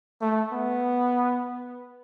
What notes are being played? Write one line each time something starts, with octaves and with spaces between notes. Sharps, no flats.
A3
B3